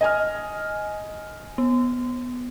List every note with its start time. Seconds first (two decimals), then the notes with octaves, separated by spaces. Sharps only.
0.01 D#5 G#5 F6
1.58 B3